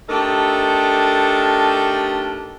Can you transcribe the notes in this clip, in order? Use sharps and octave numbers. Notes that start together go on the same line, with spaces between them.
A3 D4 D#4 G4 A4 A#4